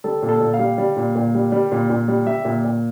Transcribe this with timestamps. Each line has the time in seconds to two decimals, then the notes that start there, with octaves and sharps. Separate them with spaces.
0.04 G3 A4
0.22 A#2
0.29 A4
0.40 A#2
0.54 F5
0.59 G3
0.78 G3
0.97 A#2
1.15 A#2
1.34 G3
1.52 G3
1.72 A#2
1.90 A#2
2.08 G3
2.26 G3 E5
2.45 A#2
2.65 A#2